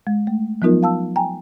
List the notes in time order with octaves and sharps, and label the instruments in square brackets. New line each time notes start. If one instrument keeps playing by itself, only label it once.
[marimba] G#3
A3
F3 F#3 B3 D#4 F4 A#4
F5 A5 E6
G5 G#5 A#5